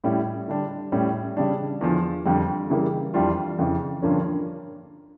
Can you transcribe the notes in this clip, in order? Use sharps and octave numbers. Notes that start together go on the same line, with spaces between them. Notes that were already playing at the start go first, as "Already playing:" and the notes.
A2 G3 C#4 E4
D3 G3 D4
A2 G3 C#4
C#3 G3 D4
E2 D3 F3
F2 D3 G3
C#3 E3 G3 A#3
F2 E3 G3 D4 F4
F2 C#3 E3
G2 D3 F3 A#3 C#4